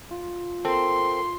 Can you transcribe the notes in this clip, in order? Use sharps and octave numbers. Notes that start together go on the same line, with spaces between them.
F4
C4 A4 A#4 C6